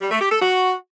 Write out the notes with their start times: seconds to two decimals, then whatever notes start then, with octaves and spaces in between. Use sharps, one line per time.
0.01 G3
0.11 A3
0.21 G4
0.31 A4
0.42 F#4